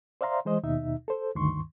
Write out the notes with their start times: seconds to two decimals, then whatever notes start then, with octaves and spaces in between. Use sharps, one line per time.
0.21 C5 D5 E5 F5 A#5 C6
0.45 E3 G#3 C5 D#5
0.63 D#2 B2 D#4 E5
1.08 A4 C5
1.35 D2 G2 D#3 C6 C#6